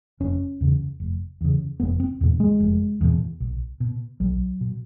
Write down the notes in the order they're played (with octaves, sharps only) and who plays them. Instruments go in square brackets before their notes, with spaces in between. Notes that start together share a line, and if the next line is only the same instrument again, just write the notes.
[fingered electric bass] F1 C#4
E2 C#3
F1
E2 C#3
F1 B3
C4
E2 B2
G#3
F1
E2 B2
B1
B2
B1 F#3
B2